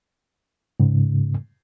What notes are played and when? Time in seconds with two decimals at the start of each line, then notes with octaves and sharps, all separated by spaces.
0.80 G#2 C#3